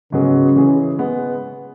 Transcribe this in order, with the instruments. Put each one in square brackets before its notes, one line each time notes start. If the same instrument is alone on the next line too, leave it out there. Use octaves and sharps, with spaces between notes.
[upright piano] G#2 F#3 B3 G#4 [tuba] C#3
[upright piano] E3 C#4 G#4
G#3 B3